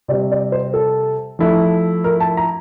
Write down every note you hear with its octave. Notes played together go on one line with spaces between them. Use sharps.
C3 G3 C4 D5
D5
C5
A4
F3 A3 E4
A#4
A5
A#5